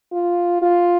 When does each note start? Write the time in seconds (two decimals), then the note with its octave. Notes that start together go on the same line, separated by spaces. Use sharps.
0.12 F4
0.62 F4